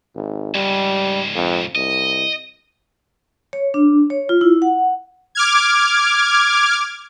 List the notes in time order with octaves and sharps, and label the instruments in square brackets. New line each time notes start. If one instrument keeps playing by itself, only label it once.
[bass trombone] G#1
[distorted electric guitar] C#2 G#2 [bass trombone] G3
[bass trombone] F2
[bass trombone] C2 [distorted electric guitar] D#5
[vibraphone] C#5
D4
C#5
F4
E4
F#5
[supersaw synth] D6 F6 G#6